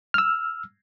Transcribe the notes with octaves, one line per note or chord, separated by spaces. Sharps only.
E6 F6